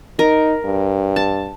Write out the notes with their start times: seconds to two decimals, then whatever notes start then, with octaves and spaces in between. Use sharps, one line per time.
0.19 D#4 A#4
0.65 G2
1.16 A5